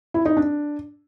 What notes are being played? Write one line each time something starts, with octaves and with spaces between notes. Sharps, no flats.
E4
D#4
D4